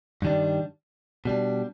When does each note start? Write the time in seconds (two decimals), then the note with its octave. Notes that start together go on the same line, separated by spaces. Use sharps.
0.22 G2 D#3 G3 D4
1.25 B2 G3 D4